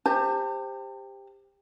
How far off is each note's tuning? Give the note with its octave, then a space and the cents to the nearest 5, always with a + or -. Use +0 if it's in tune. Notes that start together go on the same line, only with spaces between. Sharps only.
G4 +20 C5 +0 A5 +45